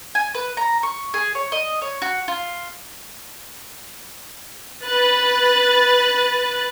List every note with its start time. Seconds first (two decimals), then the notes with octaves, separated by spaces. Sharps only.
0.15 G#5
0.35 B4
0.57 A#5
0.83 C#6
1.14 G#4
1.35 C#5
1.52 D#5
1.82 C#5
2.02 F#4
2.28 F4
4.86 B4 F#6 A6